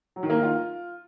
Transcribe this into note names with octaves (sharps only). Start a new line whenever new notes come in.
F#3
D#3
A#3
D#3
F4